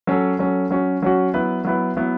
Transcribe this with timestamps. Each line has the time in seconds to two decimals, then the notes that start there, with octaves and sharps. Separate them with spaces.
0.07 F#3 C#4 A4
0.39 F#3 C#4 A4
0.71 F#3 C#4 F#4
1.03 F#3 C#4 F#4
1.34 F#3 B3 E4 B4
1.65 F#3 B3 E4 B4
1.96 F#3 B3 E4